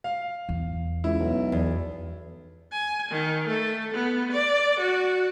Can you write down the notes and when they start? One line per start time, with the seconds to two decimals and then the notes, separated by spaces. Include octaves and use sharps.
0.04 F5
0.49 E2
1.04 C#2 E4
1.19 B1
1.52 E2
2.72 G#5
3.11 D#3
3.47 A3
3.94 B3
4.31 D5
4.79 F#4